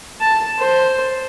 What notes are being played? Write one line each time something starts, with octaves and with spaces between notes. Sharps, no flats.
A5
C5